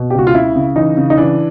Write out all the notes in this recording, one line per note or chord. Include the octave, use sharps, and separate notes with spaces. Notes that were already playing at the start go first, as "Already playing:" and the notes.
Already playing: B2
G4
C#2 F#4
F4
C#3 E4
C#3
E3 D#4
C#3
D#4
E3 D4